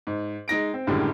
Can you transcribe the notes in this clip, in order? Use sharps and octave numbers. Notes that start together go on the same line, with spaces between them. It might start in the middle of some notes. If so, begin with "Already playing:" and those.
G#2
G#3 D#4 A#6 D7
C4
F#2 A2 D3 D#3 G3 G#3